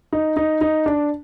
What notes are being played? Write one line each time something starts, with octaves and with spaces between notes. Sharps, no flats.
D#4
D#4
D#4
D4